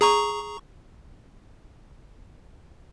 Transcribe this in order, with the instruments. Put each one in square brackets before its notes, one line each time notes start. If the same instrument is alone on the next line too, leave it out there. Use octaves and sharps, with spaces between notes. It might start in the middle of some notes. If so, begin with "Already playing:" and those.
[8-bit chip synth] G#4 A#5 C#6